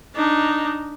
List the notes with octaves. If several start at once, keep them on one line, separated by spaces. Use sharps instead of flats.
D4 D#4